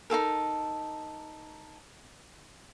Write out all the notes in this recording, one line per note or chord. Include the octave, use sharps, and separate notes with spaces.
D#4 F4 A4 A#4